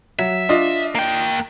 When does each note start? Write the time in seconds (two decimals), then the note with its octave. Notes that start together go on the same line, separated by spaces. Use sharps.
0.19 F#3 E5
0.49 D4 F4 D#5
0.95 A#3 G5